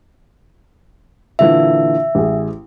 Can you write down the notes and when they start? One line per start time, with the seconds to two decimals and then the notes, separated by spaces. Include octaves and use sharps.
1.39 A#2 D3 E3 E5
2.15 A1 G#4